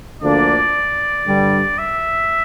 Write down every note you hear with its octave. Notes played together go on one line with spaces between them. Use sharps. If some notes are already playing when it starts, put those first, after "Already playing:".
D2 D3 F3 A#3 D4 D5
G2 D3 G3
E5